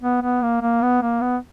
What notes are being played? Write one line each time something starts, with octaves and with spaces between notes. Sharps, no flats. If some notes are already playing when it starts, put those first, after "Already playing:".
B3
B3
A#3
A#3
B3
A#3
B3